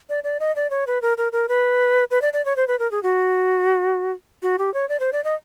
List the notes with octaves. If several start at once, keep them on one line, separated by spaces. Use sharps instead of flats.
D5
D5
D#5
D5
C#5
B4
A#4
A#4
A#4
B4
B4
D5
D5
C#5
C5
B4
A#4
G#4
F#4
F#4
G4
C#5
D5
C5
D5
D#5